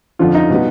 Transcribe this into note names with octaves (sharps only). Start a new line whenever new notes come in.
F2 D3 F3 F4
D#4
B2 G3 B3